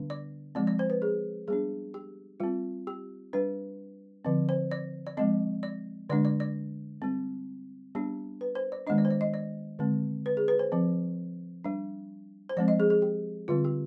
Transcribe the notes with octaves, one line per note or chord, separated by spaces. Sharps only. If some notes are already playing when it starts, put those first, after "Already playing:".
Already playing: D3 G3 B3 D4
D5
F3 G#3 C4 D5
D5
C5
B4
G#4
G3 B3 D4 G#4
G4
G3 C4 F4
G4
G3 D4 B4
D3 F3 C4
C5
D5
D5
F3 G#3 C4 D#5
D5
D3 G#3 D4 D5
D5
D5
G3 C4
G3 B3 D4 G4
B4
C5
D5
D#3 G#3 B3 D4 D#5
D5
C5
D5
D#5
D5
D3 G#3 C4
B4
G#4
B4
C5
F3 C4
G3 D4
C5
F3 G#3 C4 D5
D#5
G#4
G#4
G4
D3 G3 C4 F4
G4